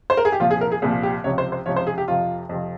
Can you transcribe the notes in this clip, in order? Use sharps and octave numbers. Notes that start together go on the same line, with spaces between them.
C5
A#4
G#4
G4
C2 A#2 F3 F4
G#4
A#4
G#4
C2 A#2 F3 G#4
G4
C#2 C3 F3 C#5
C5
C5
C#2 C3 F3 C#5
C5
G#4
G4
F2 C3 F3 F4
F2 C3 F3